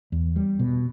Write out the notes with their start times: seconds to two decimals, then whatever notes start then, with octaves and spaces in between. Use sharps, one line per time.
0.12 E2
0.36 G3
0.59 B2